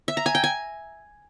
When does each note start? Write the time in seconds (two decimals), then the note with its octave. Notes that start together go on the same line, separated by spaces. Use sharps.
0.08 E5
0.17 A#5
0.26 G#5
0.35 G5
0.44 G#5